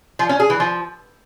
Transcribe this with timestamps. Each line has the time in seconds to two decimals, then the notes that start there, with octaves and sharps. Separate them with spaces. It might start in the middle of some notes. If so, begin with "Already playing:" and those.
0.19 F3
0.29 C#4
0.40 G#4
0.50 E3
0.60 F3